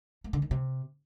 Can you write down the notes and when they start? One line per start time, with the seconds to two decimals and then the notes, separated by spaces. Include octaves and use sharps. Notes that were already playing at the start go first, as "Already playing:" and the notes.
0.24 A3
0.33 D3
0.42 D#3
0.51 C3